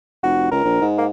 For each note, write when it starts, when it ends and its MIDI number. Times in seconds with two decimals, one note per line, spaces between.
0.24 0.51 29
0.24 0.49 66
0.51 0.60 37
0.51 0.86 70
0.64 0.79 34
0.81 1.09 44
0.98 1.06 58